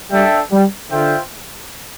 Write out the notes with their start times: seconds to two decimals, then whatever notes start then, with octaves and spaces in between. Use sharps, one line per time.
0.11 G3 D4 A4 E5 G5
0.51 G3
0.90 D3 F4 C5 E5 G5